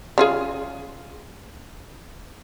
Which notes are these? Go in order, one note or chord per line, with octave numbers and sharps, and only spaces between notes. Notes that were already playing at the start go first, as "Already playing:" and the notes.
C#3 F4 G#4